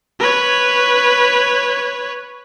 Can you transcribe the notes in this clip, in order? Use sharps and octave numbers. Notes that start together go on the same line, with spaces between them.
B4 C#5